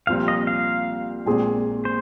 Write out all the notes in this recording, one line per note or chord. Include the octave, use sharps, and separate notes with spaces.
C2 A#2 F3 C4 F4 F5
D#5
F5
A#1 A#2 G#3 C4 G#4
C5